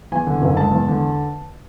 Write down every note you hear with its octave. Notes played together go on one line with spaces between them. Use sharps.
E2 G#5
D3
F#1
G#3 A5
E2
D3